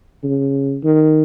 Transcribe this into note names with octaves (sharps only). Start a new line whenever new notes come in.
C#3
D#3